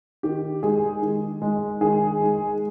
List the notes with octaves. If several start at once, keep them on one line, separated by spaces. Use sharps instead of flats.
D#3 G4
G#3 G#4
D#3
G#3
D#3 G#4
G#3